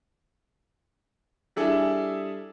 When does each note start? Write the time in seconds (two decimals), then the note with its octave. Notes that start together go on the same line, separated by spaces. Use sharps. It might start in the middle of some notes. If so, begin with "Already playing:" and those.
1.56 G3 D4 E4 G#4 A4